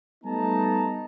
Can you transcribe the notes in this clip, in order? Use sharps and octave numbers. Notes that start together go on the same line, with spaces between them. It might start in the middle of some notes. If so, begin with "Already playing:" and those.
G3 A3 B3 D#4 A5 A#5